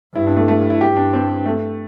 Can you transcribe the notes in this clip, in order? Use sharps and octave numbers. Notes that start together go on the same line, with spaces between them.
G2 E4
D4
A3
A3
E4
G2 G4
D4
C4
A3